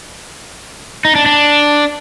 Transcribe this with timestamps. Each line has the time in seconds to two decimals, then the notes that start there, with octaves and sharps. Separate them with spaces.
1.05 D#4
1.15 D4
1.26 D4